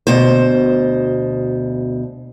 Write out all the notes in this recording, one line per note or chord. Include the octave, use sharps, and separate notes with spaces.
D2 B2 C5